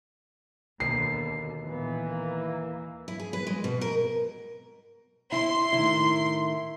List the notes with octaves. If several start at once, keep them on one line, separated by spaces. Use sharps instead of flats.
D#2 B2 D3 C7
A#2 E3 B3
A#3
E4
G#4
B4
G#3
B2
A#4
E4 C6
A2 D#3 E4